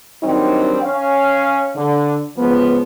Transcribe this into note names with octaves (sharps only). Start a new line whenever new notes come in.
D#3 F#3 G3 C4 D4 D#4
C#4 F5
D3
C#2 F3 B3